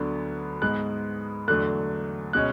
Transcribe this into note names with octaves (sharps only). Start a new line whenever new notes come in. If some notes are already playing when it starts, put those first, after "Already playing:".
Already playing: D2 D3 F#3 B3
G#2 G#3 B3 F#6
E2 D3 F#3 A3 F#6
B2 G#3 C#4 F#6